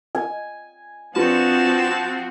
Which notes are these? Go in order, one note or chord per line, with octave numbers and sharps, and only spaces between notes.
G#5
F3 C4 D4 F4 F#4 B4 A5